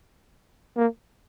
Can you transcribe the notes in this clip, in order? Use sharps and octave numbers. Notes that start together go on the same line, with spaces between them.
A#3